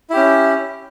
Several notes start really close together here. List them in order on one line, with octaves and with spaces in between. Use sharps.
E4 G4 C#4